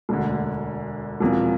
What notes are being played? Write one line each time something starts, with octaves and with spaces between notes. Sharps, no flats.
E1 D2 D3
E1 E2 C3 F3